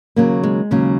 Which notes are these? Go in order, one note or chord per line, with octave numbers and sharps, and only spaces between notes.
D#2 C#3 F#3 A#3
G#3
D#2 C#3 F#3